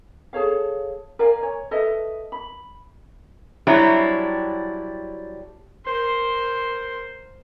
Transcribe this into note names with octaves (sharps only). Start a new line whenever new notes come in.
G#4 A4 C#5 F5
A#4 D5 F5 G#5
C#5
A4 B4 D#5 E5
B5
F#3 G3 C4 D4 E4 C#5
A#4 C5